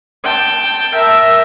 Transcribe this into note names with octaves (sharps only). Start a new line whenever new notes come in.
G5 A5
A#4 E5